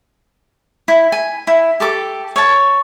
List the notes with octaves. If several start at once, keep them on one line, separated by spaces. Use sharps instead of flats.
E4
G#5
E4
G4 A4 D6
C#5 A5